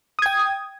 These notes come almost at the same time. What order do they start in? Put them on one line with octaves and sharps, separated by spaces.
D#6 G#6 G5